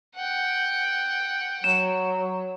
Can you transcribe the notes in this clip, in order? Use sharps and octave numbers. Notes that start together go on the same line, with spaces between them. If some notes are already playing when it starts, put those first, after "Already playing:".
F#5 G5
F#3 E7